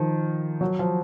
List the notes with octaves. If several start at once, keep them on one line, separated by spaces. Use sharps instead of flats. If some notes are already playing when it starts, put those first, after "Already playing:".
Already playing: D#3 F3
F#3
F3